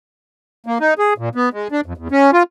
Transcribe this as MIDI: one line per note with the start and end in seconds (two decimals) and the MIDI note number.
0.66 0.78 58
0.80 0.94 63
0.99 1.14 68
1.18 1.29 46
1.35 1.49 59
1.53 1.68 56
1.72 1.81 62
1.86 1.93 41
1.97 2.08 40
2.11 2.31 61
2.33 2.43 65